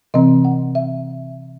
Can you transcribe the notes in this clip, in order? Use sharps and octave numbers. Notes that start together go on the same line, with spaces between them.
C3 E3 C4 D#5
F#5
E5